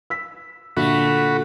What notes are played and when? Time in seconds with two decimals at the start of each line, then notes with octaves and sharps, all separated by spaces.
0.10 E6 B6
0.77 A#2 D3 A3 F#4 B5